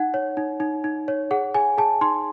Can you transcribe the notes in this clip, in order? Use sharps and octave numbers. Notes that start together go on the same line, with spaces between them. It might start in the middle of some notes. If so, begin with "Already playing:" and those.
Already playing: D#4 F#5
C#5
D#4
D#4
D#4
C#5
G#4 F#5
G#4 G#5
G#4 A5
D#4 C6